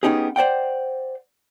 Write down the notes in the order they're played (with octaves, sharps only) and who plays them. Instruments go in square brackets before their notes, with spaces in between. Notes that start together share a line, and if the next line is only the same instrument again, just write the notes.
[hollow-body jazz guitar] B3 C#4 D#4 G4 G#4
C5 D5 F#5 G5